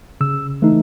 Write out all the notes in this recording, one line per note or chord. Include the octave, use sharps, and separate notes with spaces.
C#3 E6
E3 A3 D#4